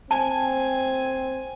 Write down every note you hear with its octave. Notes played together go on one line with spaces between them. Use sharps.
C4 G#5 A5